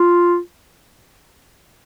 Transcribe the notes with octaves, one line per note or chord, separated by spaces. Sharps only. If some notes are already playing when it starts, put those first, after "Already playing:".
Already playing: F4